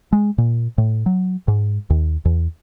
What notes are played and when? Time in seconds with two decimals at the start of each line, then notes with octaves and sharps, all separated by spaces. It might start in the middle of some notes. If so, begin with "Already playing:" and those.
0.13 G#3
0.38 A#2
0.78 A2
1.06 F#3
1.48 G#2
1.90 D#2
2.25 E2